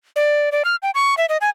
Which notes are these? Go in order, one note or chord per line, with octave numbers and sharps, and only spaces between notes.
D5
D5
F6
G5
C#6
E5
D#5
G#5